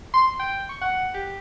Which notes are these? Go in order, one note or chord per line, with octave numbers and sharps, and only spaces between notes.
C6
G5
C#6
F#5
G4